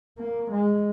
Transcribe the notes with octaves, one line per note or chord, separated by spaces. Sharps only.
A#3
G#3